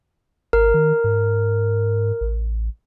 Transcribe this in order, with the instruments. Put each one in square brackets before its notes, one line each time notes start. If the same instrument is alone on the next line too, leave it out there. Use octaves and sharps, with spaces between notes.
[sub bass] G#1 [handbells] A#4
[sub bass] D#3
G#2
A1